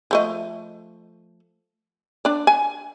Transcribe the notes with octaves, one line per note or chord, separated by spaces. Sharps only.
F3 A3 D#5
D4 D5
G#5